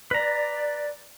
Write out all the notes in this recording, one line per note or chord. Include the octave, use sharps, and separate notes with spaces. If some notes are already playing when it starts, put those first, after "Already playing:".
B4 D5 A#5